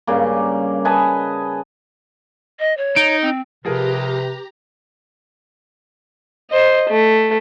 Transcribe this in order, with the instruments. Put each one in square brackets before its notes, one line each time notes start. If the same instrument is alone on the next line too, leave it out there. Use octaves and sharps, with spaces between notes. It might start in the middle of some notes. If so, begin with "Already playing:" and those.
[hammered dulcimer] G2 C#3 A#3
B4 D#5 G#5 A5
[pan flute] D#5
C#5
[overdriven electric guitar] D#4 [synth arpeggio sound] D7
[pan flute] C4
[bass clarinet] C3 [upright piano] F3 G#4 A#4 [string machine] G4 A#5 [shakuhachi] B4
[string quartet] C5 D#5
A3